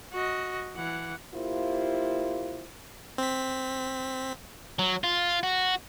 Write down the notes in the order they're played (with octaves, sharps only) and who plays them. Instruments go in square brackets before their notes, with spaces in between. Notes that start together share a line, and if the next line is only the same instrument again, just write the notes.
[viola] F#4 D#5
E3 F#5
[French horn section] A#3 E4 F4 G4 C5
[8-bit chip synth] C4 B6
[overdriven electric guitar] F#3
F4
F#4